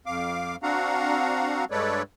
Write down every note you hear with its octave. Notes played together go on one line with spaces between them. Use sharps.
F2 F5 D6
C4 D4 F#4 F5 F#5 A#5
G2 G#3 A4 B4 C#5 D5